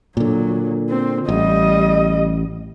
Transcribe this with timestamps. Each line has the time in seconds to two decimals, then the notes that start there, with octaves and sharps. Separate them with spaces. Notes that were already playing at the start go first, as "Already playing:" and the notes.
0.17 A#2 D3 F#3
0.90 C4
1.29 A1 G3 D#5